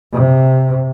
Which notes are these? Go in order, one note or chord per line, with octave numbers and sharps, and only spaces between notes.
C3